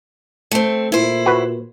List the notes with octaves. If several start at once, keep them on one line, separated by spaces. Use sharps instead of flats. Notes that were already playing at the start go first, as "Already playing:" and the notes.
A3 C4
A#2 E4 C5
F#4 B4